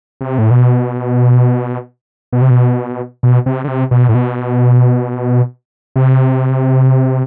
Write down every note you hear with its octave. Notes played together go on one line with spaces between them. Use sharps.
C3
A2
B2
B2
C3
B2
B2
C3
D3
C3
B2
A2
B2
C3